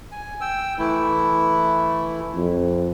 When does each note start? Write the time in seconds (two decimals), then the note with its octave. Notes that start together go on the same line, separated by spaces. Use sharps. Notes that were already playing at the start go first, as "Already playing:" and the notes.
0.12 G#5
0.41 G5 E6
0.78 E3 A3 E4
2.35 F2